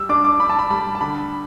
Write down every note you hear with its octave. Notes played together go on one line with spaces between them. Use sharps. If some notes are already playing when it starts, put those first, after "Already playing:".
Already playing: G3 E6
D4 D6
D6
D4 B5
A5
B5
G3 B5
A5
D3 B5